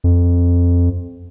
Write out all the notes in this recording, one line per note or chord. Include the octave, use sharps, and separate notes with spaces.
F2